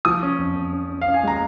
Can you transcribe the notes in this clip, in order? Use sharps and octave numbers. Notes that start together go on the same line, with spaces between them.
F3 D#6
C#4
F2
F2
C#4
C#4
C#4 F5
G#5
G#3 A#5